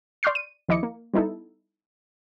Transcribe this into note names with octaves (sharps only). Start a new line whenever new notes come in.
D5 C6 C#6 F6 G6 C7
D#7
D#2 F3 E4 D#5 D6 C#7
A#3
G3 B3 D#4 E4 A4